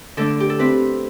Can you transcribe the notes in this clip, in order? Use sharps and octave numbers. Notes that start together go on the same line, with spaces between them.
D3 A3 D4 A4
G4
A4
C4 E4 B4